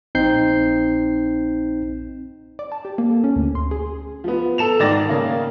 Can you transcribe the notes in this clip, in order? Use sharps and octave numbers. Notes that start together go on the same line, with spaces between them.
A#1 C4 D#4 G6 C7
D5
A5
G4
A#3
A4
C#4
D2
C6
G#4
F3 B3
A4 E7 F7
G#2 D#3 D5 A6 A#6
C#3 A#3